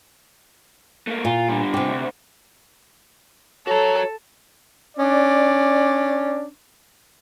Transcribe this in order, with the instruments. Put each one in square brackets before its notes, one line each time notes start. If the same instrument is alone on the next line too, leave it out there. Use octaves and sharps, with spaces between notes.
[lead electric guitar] A3 A#3
[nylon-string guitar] A#2 [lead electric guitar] F4
[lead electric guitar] D3 G3
[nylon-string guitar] C3 G4
[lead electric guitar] D2
[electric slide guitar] F#4 A#5 [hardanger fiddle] A4 [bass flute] C#5
[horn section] C#4 D4 D5